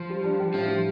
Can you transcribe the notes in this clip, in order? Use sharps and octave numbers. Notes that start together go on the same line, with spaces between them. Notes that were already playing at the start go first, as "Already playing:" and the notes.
Already playing: F3
G3
D4
G4
A2 F3
G3